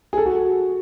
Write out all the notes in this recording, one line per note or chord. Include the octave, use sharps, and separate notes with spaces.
G#4
A4
F#4